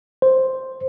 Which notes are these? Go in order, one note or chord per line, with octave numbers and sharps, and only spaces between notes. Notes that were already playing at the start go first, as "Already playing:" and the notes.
C5